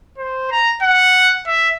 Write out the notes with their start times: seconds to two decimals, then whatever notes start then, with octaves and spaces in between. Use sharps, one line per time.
0.18 C5
0.51 A#5
0.82 F#5
1.47 E5